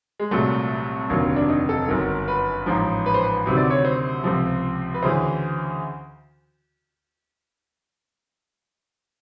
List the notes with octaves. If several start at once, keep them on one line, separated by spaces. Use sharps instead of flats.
G#3
C2 A#2 F#3 A3
F1 D#2 D3 F#3 A#3
D4
D#4
A4
G1 F#2 D#3 A#4
B4
A1 G#2 F3
B4
C5
B4
D2 C3 D#3 F#3
D5
C#5
C5
C#2 C3 F3
B4
D2 C#3 E3 C5